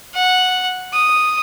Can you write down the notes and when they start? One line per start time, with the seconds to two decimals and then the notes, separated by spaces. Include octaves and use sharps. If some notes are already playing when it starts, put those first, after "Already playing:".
0.14 F#5
0.93 D#6